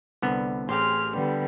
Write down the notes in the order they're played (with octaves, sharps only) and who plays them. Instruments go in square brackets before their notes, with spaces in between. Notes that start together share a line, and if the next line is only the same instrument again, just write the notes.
[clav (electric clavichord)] C2 D3 B3
[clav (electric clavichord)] A1 [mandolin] C4 G4 C6 [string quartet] G#4 F6
[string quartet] D3 G3 B3